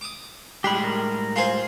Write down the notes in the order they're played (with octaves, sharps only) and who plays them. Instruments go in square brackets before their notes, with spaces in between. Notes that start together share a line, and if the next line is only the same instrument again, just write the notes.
[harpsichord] D6 D#6
[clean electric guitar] A2 G3 G#3 [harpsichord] D4 [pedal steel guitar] G4 B5
[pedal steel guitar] A#4
[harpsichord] F4 G#4 C5